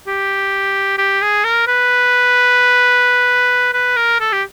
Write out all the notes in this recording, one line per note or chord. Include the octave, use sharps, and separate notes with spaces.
G4
G4
G#4
A#4
B4
B4
A#4
A4
G4